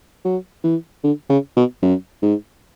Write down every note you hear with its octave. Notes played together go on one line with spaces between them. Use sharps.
F#3
E3
D3
C#3
B2
F#2
G#2